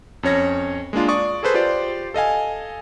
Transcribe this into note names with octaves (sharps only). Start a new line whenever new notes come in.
F2 C#4 C#5 A#6
G#3 A#3 D4 F4
D5 C#6 D#6
G#4 A4 B4 C5
F4 G4 C5 D5
A4 D#5 F5 G#5